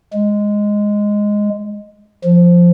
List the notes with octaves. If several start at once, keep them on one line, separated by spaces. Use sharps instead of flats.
G#3
F3